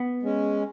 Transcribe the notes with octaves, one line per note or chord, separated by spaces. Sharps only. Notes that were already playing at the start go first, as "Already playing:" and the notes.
Already playing: B3
G#3 C#4